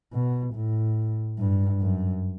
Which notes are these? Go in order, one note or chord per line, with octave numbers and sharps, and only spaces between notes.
B2
A2
G2
F#2